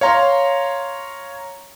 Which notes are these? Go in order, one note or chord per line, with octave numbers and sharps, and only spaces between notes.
C#5 F5 A#5 C6